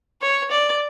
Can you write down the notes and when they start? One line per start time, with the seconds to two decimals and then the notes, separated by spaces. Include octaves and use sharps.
0.21 C#5
0.51 D5